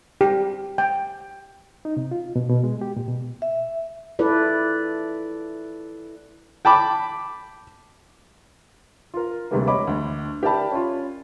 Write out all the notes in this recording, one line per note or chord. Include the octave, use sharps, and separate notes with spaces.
G4
G5
D#4
C3
F4
B2
B2
G#3
G4
A#2
B2
E5
E4 F4 A4 B4 D5
G5 A5 B5 D6
F4 A#4
D2 C3 G3 G#3 A#3 B3
C#5 D#5 B5 D6
D2
G4 A#4 D5 E5 A5 B5
C#4 F4